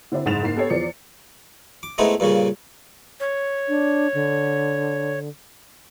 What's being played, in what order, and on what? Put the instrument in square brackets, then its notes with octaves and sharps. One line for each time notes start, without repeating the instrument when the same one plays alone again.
[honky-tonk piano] D3 C4 D4 E4
F#1 G#2 G#3 A6 E7 F7
G#2 A#3 C7
B3 G4 A4 C#5
E2 F3 D5 C#7
[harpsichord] D6
G#3 A3 B3 C4 D#4 E4
G2 A#2 C#3 C#4
[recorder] C#5
[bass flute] D4
D3